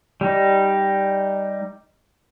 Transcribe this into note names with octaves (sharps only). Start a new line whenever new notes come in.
G3 D#4